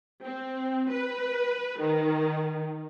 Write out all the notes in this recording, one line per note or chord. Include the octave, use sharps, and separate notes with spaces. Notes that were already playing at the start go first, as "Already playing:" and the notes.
C4
B4
D#3